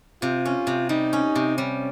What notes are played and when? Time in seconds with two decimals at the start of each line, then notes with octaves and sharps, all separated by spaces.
0.22 C3 F4
0.45 C#4
0.67 C3
0.89 G3 D#4
1.13 C#4
1.35 C3
1.57 G3 C#4